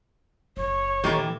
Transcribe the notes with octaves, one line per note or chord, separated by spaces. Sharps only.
F#1 C#5
A#2 D#3 E3 A3 A#3 E4 G4